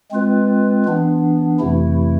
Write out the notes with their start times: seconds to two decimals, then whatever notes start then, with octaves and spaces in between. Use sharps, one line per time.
0.11 G#3 C4 F4 B4
0.85 E3 B3 D4
1.59 F2 C3 E3 A3 E4